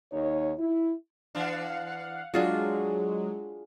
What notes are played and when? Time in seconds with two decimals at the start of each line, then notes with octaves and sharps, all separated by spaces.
0.12 D#2 D#4 C#5
0.58 E4
1.35 E3 D4 F5 F#5
2.34 F#3 G#3 D4 F4 F#4 G#4